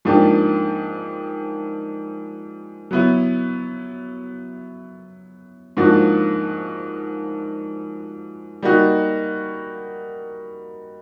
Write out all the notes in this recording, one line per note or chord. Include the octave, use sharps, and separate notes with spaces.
G#2 F3 A#3 D4 G4
F#3 B3 E4
G#2 F3 A#3 D4 F#4
G3 A#3 D#4 F#4